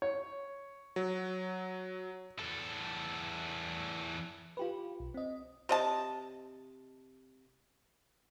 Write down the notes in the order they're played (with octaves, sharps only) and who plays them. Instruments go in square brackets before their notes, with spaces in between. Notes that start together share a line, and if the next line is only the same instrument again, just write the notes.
[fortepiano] C#5
[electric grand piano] F#3
[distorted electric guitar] E2 A4
[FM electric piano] F4 G4 B4
B1
C4 D#5
[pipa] C3 D#5 A5